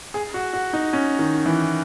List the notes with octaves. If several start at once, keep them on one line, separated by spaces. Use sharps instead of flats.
G#4
F#4
F#4
D#4
C#4
D#3
E3